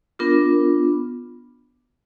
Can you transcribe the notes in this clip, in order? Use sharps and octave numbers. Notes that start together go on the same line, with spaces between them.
B3 D4 F4 A#4